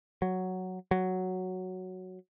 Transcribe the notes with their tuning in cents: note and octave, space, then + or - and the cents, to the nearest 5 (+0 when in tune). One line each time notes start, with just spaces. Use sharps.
F#3 +0
F#3 +0